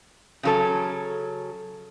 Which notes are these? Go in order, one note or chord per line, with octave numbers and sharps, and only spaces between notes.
C#3 F#3 A4